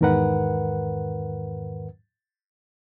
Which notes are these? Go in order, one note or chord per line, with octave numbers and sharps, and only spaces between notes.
E2 G#2 D#3 A#4 B4 F#5